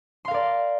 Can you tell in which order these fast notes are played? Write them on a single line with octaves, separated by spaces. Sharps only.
C6 F5 A#4 D5